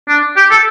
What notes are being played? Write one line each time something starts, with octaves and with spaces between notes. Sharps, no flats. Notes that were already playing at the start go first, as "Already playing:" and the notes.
D4
G4
A4